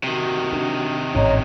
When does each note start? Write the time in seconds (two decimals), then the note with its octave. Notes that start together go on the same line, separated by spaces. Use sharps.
0.04 C3 D#3 F#4
0.53 D4
1.15 A1 G#2 C#4 C#5 D#5 A#5